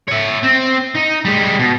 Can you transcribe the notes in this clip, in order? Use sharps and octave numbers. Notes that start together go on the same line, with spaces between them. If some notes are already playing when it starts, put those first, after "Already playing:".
C#5 E5
C4
D#4
G3 G#3
B2